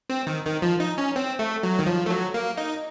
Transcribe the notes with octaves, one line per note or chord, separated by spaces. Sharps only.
C4
D#3
D#3
F3
D#4
C#4
C4
A3
F#3
D#3
F3
A3
F#3
A#3
D#4